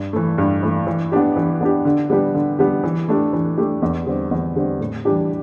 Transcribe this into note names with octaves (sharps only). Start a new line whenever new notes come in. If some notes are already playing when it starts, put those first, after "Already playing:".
Already playing: G2
E3 A3
G2
E3 A3
E3
B3 D4 G4
E3
B3 D4 G4
D3
G3 B3 D4 G4
D3
G3 B3 D4 G4
E3
A3 D4 G4
E3
A3 D4 G4
E2
D3 G3 C4
E2
D3 G3 C4
A2
E3 G3 D4 G4